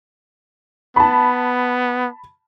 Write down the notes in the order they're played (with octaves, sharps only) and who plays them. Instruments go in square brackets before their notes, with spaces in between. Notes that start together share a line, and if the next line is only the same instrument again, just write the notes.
[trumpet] B3 [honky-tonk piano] A5 B5